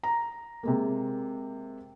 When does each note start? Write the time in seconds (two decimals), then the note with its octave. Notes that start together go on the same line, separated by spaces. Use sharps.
0.03 A#5
0.63 C3 G#3 A#3